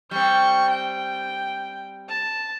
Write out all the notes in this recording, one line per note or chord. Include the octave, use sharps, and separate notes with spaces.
G3 C4 C#6 G6
G5
A5